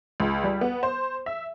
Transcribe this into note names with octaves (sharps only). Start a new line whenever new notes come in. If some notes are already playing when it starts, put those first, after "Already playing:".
C#2
G3
B3
C5
E5